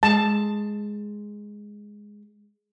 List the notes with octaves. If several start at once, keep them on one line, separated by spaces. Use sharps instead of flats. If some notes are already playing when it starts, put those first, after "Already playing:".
G#3 A5